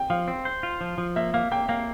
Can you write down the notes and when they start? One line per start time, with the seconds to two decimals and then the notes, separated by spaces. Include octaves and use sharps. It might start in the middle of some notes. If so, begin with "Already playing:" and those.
Already playing: G5
0.10 F3 F5
0.28 C4
0.45 C5
0.63 F4
0.81 F3
0.98 F3
1.16 A#3 E5
1.34 A#3 F5
1.51 A#3 G5
1.69 A#3 F5